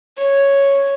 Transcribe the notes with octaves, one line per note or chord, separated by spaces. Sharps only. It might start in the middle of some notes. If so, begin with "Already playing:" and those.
C#5